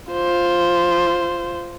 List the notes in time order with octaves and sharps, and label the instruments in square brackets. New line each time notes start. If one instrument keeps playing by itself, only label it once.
[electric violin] F4 C5